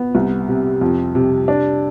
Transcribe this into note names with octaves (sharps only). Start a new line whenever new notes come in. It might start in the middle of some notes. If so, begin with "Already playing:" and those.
Already playing: B3
C2
C3
F2
C3
D4